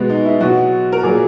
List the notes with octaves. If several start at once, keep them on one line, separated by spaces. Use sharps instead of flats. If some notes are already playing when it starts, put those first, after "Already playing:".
Already playing: B2 G#3 B3
D#4
E4
B2 F#3 F#4
A#4
A#2 F#3 G#4